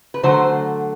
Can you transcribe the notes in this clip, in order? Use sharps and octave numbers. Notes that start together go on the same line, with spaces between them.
B4
D3 F#3 A3 C5